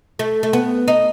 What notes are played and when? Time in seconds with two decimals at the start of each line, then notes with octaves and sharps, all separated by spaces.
0.19 A3
0.43 A3
0.53 B3
0.88 D#4